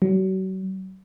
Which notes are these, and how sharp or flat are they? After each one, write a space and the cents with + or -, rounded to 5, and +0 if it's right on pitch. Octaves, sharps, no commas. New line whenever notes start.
F#3 +35